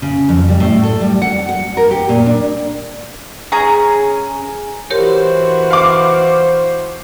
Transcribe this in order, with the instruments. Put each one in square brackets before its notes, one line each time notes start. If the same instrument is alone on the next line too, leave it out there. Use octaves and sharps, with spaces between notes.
[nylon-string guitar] C#3
F2
G3
A2
A4
G3
F#5
F#5
A#4
G4
A#2
D4
[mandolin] C#4 G#4 A#5
[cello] E3 F#4 [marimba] G4 A#4 C#5 [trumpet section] C5
[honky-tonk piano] F5 D6